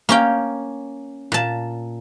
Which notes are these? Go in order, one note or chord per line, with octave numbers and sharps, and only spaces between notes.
A#3 C#4 G5
A#2 A5